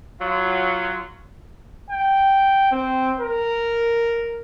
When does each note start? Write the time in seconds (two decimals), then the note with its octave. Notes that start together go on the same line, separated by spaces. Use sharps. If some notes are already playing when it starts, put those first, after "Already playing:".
0.20 F#3 F4
1.91 G5
2.72 C4
3.19 A#4